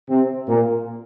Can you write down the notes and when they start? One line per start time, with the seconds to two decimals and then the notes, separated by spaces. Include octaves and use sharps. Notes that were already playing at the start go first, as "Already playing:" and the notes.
0.09 C3 C4
0.49 A#2 A#3